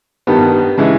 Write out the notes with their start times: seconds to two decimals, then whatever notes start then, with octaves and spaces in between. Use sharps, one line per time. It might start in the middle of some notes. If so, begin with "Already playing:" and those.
0.27 G2 D#3 G3 B3
0.78 C#3 E3 G#3